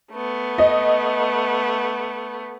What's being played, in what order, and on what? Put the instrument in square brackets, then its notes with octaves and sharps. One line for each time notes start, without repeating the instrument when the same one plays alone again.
[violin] A3 B3
[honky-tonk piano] D#5